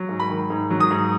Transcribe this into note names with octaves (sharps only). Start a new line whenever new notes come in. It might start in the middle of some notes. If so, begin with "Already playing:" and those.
Already playing: F#3
G#2
B5
D#3
G#2
F#3
D#6
G#2